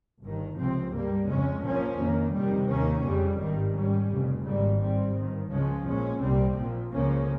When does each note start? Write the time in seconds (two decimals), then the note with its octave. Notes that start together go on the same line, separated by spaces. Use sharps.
0.21 G1 G2 D#3
0.57 C#2 C3 F3 C4
0.93 G2 G3 A#3
1.27 F2 C#3 G#3 C#4
1.63 A#1 A#2 F3 A#3 C#4
1.98 F2 D#3 A#3
2.34 F2 C3 D#3 G3
2.69 D#2 D#3 A#3 C#4
3.05 F2 C#3 G3
3.39 G#1 G2 D#3 G3
3.74 G#2 G3 C#4
4.10 F1 F2 C#3
4.46 G#1 G#2 G3 A#3
4.81 G2 G3 C4
5.16 G1 G2 D#3
5.51 C#2 C#3 F3 G#3 C#4
5.87 A#1 A#2 G#3 C#4
6.21 C2 A#2 G3 C4
6.57 A#1 A#2 F3
6.92 C#2 C#3 F3 A#3 C#4